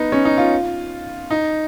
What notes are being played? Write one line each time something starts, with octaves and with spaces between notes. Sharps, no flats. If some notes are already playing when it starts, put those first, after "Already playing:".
Already playing: B3 D#4
C#4
D#4
F4
D#4